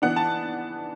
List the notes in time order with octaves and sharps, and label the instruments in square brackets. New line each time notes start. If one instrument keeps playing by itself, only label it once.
[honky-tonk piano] E3 B3 D4 F#5
A5